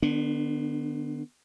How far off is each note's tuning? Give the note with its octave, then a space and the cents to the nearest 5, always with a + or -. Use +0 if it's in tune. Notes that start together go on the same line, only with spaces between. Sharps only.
D3 +45 B3 +0 D4 -10